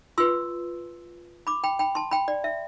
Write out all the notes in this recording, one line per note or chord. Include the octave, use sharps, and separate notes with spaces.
F4 B4 C6 E6
B5 D6
G5 B5
G5 B5
A5 C6
G5 B5
D5
E5